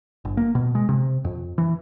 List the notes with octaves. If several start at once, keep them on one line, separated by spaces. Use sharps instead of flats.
G1
A#3
B2
G#3
C3
F2
E3